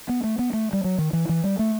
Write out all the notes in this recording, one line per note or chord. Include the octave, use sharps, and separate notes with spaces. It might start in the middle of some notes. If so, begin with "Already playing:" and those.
B3
A3
B3
A3
G3
F#3
D#3
E3
E3
G3
A3